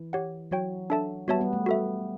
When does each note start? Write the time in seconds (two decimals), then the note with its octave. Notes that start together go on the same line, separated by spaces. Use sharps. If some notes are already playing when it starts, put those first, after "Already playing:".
Already playing: E3
0.13 G4 C#5 F#5
0.51 F#3 F#4 C#5 G5
0.90 D4 A4 E5 A5
1.28 G3 B3 F#4 C#5 E5 A5
1.41 G3 B3
1.53 A3
1.66 F#4 A4 E5